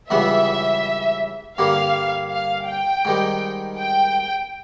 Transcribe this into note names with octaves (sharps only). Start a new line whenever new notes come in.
C#2 C#3 E3 G3 B3 E5
G2 D3 G3 A#3 F5
F5
G5
G#2 D#3 G3
G5